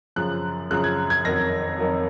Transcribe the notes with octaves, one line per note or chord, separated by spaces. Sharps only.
F#2 C#3 F3 F#6
F#2 C#3 F3 F#6
G#6
G#6
F2 D#3 F#3 A#6
F2 D#3 F#3